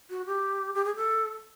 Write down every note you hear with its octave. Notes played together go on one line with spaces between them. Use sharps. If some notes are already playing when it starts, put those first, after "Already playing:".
F#4
G4
G4
G#4
A4